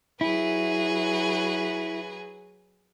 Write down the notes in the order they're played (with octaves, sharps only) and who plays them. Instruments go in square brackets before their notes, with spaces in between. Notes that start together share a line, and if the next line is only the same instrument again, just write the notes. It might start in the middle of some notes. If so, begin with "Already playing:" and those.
[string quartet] F#3 G#4 B4 [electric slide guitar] E4